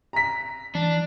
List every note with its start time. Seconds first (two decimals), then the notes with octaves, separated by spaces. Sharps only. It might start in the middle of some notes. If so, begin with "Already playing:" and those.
0.13 A#5 B6
0.75 E3 D4